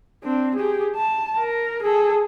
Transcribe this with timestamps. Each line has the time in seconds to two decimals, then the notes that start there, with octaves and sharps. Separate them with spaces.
0.24 C4 D4
0.55 G4 G#4
0.96 A5
1.38 A#4
1.82 G#4 A4